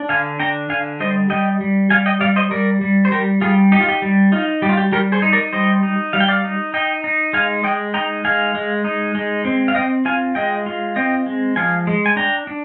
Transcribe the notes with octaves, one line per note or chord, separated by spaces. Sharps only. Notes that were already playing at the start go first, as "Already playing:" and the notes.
Already playing: D4
D3 F5 G#5
D4 G5 A#5
D3 F5 G#5
G3 C5 D#5
G3 D#5 G5
G3
G3 F5 G#5
D#5 G5
G3 D5 F5
C5 D#5
G3 A#4 D5
G3
C5
G3 G4 A#4
G3 F4 G#4
D#4 G4
F4
G4
G3
D#4 F4
G3 G4
F4
G4
G3 G4 A#4
G#4 C5
D#4
A#4 D5
G3 C5 D#5
D#4
G3 F5
G5
D5 F5
D#4
D#4 D#5 G5
D#4
G#3 F5 G#5
G#3 D#5 G5
D#4 G5 A#5
G#3 F5 G#5
G#3
D#4
G#3
C4
F5
C4 D#5 G5
F4 F5 G#5
G#3 D#5 G5
F4
C4 D#5 G5
G#3
F3 F5 G#5
G#3
G#5
D4 G5 A#5
D4